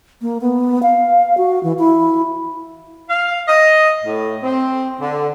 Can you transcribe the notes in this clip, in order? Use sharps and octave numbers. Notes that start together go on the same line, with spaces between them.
A#3
B3
F5
F#4
E3
E4
F5
D#5
A2
C4
D3